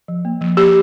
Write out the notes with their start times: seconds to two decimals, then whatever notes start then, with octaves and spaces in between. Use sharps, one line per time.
0.08 F3
0.25 A#3
0.41 F3
0.57 A#3 G4